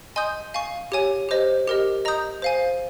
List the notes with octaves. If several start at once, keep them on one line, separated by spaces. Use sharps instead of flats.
D#5 G#5 C6 D#6 G6
F5 G#5 C#6
G4 C#5 G#5
G4 C5 D#5
G4 A#4 D#5
D#5 A#5 D#6 G6
C5 F5 G#5